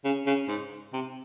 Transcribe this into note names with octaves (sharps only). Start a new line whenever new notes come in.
C#3
C#3
G#2
C3